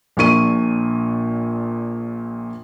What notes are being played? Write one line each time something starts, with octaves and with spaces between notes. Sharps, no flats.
A#1 A#2 C#6 D#7